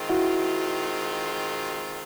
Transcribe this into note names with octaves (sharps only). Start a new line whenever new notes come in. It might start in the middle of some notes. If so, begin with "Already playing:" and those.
Already playing: D#3 G#3 C4 F4
E4 F#4